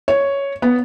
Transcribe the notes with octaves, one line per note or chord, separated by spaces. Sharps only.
C#5
B3